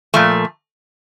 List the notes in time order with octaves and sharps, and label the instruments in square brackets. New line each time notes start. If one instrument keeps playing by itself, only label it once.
[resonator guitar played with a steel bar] A#2 F3 A3